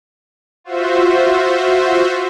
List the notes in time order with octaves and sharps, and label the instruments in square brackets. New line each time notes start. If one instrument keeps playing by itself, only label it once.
[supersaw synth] F4 F#4 C5 E5